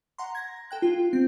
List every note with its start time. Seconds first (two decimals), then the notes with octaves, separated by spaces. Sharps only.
0.18 F#5 A#5 C6
0.35 G#6 A#6
0.71 A4 G5 F#6
0.82 F4
1.13 C4